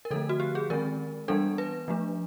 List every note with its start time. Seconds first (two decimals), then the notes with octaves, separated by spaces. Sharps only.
0.05 A#4
0.11 D3 F3 A3 A4
0.29 F#4
0.40 G4
0.55 G#4
0.70 D#3 G#3 C4 A#4
1.28 E3 G3 B3 D4 A4
1.58 B4
1.88 F3 A3 D4